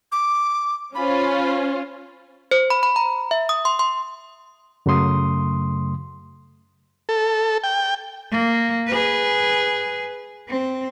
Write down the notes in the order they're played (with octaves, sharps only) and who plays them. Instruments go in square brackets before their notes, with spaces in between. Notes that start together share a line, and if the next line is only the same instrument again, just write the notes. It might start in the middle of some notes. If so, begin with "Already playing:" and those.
[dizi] D6
[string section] C#4 F4 C5 [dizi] B5
[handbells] C5
B5
B5
A#5
E5
D#6
C6
C6
[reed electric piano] F#2 C#3 F#3 A3 C6 D#6
[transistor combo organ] A4
G5
[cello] A#3
G#4 B4
C4